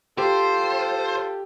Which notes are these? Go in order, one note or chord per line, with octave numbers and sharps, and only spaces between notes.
F4 G4 A4 C5